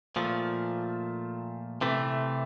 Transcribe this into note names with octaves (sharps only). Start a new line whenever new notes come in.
A#2 F3 A3
C3 E3 A3